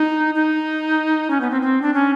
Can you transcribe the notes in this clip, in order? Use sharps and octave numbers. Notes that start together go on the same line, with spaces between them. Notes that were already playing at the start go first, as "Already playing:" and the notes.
Already playing: D#4
D#4
C#4
B3
C4
C4
D4
C#4